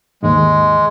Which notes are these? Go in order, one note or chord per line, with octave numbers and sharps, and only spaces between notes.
D#2 G#2 G#3